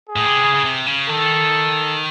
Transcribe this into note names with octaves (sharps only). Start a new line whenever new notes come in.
G#4
A2
C3
C#3
C#3
C3
C#3
D#3 A4